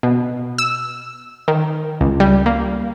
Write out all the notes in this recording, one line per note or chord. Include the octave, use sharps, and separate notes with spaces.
B2
E6
D#3
C#2
G3
A#3